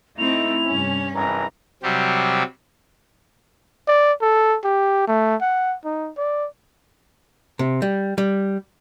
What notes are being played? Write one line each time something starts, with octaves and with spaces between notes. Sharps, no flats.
A3 C4 D#4 E4 F7
G2 C3 C#4
G#1 E3 A#4 A#5
C3 F#3 G3 C4 G4
D5
A4
G4
A3
F#5
D#4
D5
C3
G3
G3